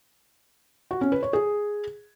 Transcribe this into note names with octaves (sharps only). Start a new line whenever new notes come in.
F#4
C#4
B4
C#5
G#4